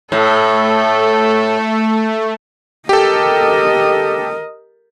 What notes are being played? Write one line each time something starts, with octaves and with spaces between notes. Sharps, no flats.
A2 A3 A4
G4 A4 A#4 D#5